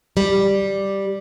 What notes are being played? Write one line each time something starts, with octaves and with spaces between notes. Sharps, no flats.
G3